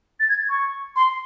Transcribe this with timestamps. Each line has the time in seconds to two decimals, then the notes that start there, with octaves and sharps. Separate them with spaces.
0.20 A6
0.29 G#6
0.49 C#6
0.96 C6